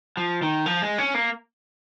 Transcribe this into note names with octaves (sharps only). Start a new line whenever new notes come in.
F3
D#3
F3
G#3
C#4
A#3